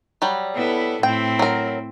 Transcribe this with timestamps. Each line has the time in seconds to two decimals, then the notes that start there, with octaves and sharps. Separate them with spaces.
0.22 F#3 G3
0.55 B3 E4 A4
1.03 A2 C4 E4 G5
1.39 F#3 A#4